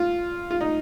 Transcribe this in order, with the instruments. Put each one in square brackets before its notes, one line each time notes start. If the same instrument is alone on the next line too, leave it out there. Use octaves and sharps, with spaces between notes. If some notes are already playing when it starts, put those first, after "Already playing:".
Already playing: [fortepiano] F4
F4
D#4